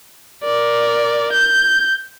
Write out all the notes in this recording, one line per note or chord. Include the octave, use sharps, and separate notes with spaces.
A#4 D5
G6